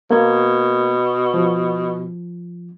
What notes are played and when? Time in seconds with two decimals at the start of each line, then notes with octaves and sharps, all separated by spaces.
0.11 B2 A#3 G#6
1.34 F3